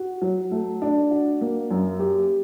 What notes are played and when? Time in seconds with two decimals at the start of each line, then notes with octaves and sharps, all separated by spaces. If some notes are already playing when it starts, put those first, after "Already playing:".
Already playing: F#4
0.22 F#3
0.51 A3
0.82 D4
1.11 F#4
1.41 A#3
1.71 F#2
2.00 G4